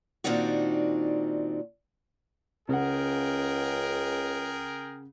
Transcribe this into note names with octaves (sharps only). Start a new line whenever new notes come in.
A#2 D#3 C4 D4 D#4 F#4
C#2 C#3 G#4 A#4 F#5 G5